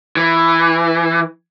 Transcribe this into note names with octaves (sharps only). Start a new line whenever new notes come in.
E3